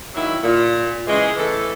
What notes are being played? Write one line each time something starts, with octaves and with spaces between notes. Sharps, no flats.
D#3 F#3 A#3 E4
A#2
C#3 E3 G#3
A2 E3 A4